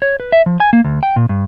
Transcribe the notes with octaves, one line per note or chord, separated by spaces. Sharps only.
C#5
B4
E5
F3
G#5
A#3
D2
G5
A#2
G2